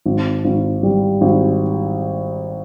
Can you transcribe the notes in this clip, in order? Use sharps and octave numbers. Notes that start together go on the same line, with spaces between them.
G#1
G#1
G3
G#1